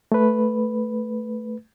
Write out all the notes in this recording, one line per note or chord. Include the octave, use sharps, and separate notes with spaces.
A3 B4